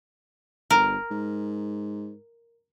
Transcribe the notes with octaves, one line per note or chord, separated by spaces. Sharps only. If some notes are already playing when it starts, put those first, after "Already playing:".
G1 A#4 A#5
G#2